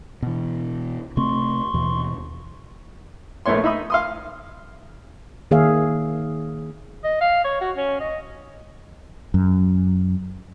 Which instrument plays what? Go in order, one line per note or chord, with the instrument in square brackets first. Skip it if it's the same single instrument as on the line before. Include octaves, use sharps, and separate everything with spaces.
[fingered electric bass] B2 E3
[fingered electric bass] C3 A3 C4 [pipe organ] C6 C#6
[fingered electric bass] D#2 B2 E3
[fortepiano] A#1 A3 B3 C#5 C6
D#4 E5 B5 D#6
F5 C6 D#6
[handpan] D#3 A#3 G#4 C#5 E5 F5
[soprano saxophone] D#5
F5
C#5
F#4
C#4
D#5
[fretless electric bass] F#2